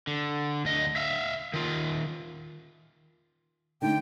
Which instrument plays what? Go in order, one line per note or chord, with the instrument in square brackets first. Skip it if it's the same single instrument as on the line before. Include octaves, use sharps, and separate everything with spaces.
[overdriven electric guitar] D3
D2 D#5
E5 F5
D#3 F4
[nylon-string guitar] D3 A3 [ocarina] D#4 [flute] G5